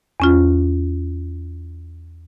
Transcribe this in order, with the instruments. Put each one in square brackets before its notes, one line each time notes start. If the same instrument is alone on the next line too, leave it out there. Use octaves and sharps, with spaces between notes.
[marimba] E2 C#4 F4